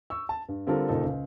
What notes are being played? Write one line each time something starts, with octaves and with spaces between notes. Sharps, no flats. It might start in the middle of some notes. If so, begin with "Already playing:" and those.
C#6 E6
A5
G2
D3 G3 C4 F4 A4 A#4
F#1 A#2 C#3 D#4 A4
C#2